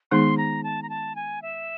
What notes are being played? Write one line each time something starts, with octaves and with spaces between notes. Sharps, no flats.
D#3 G#3 B3 D#4 G#4 C6
A#5
A5
A#5
A5
G#5
E5